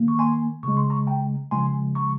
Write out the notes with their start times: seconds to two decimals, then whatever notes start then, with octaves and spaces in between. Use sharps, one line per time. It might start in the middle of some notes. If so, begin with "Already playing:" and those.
Already playing: D#3 A#3
0.08 C#6
0.19 G#5 C6
0.63 C#3 G#3 C#6
0.77 C6
0.90 A#5 C#6
1.07 G5 A#5
1.51 C#3 F3 G#3 G#5 C6
1.95 A#5 C#6